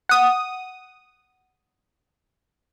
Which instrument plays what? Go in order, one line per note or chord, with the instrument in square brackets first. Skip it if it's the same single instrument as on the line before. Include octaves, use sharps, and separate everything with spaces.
[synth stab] F#5 D#6